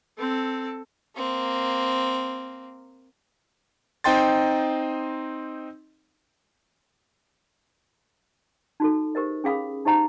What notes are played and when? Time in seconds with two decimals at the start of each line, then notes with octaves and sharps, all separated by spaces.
0.18 C4 A4
1.16 A#3 C4
4.04 C4 D#4 D#5 G5 C6 A6
8.80 D#4 F#4 A4
9.15 G4 A#4 C5 D#5
9.44 C#4 G#4 F5 B5 D#6
9.85 D#4 G4 C5 D#5 F5 A#5